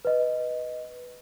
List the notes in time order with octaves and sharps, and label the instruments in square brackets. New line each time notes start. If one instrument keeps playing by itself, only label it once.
[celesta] B4 D#5